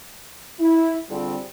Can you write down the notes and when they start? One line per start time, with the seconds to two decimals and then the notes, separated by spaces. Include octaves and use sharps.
0.59 E4
1.09 D3 G3 C4 F4 G#4